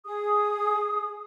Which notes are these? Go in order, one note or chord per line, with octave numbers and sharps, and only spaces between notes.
G#4 D#6